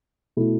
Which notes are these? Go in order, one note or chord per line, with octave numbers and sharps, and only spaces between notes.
B2 A3 E4